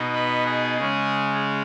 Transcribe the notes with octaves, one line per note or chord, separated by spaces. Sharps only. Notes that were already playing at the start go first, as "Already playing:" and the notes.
Already playing: B2 B3 D#4
B4
G#4
C#3 G#3 C#4 G#4